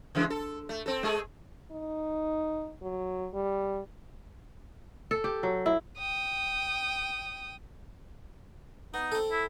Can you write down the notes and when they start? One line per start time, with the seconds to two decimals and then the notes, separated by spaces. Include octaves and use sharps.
0.15 C#3 E3 G#3
0.30 A4
0.69 A3
0.86 C4 A4
1.03 G#3 G#4 A4
1.72 D#4
2.82 F#3
3.34 G3
5.11 A4
5.24 G4
5.43 F#3
5.66 E4
5.98 G5 D#6
8.94 B3 D#4
9.12 C4 A4
9.32 E4